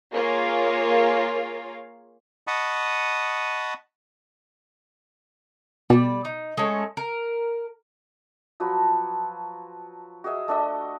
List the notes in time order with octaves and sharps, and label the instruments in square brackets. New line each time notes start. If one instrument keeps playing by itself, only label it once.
[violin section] A#3 F4 G#4 A#4 C#5 F5
[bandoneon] D#5 F#5 A5 B5 C#6 D#6
[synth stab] B2 [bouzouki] G3 D5
[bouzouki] D#4
G#3 A3 C#4
A#4
[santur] F3 F#3 F#4 B4
F#4 G#4 D#5 E5
A3 D4 F#4 D#5